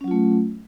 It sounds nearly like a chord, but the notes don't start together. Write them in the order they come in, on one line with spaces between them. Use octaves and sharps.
C#4 F#3 F4 A3